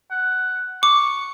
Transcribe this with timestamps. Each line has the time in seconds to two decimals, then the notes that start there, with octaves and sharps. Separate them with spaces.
0.11 F#5
0.83 C#6 D6